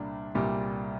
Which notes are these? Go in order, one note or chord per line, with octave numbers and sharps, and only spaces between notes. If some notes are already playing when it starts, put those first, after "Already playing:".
Already playing: C2 A#2 G3 D4
C2 A#2 G3